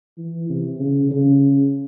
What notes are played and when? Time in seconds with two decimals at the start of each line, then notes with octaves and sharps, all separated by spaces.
0.18 E3
0.50 C3
0.79 C#3
1.11 C#3